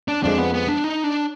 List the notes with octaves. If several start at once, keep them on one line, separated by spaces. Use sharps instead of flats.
D4
F2 F3 G#3 D4
B3
B3
D4
D#4
D4